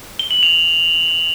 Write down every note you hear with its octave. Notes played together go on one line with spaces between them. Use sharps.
G7
F#7
F7